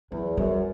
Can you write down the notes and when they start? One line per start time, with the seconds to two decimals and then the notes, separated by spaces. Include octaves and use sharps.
0.12 E2 F#3
0.37 F#2 G3